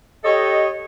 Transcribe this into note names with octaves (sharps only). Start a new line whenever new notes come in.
G4 A4 C#5 D#5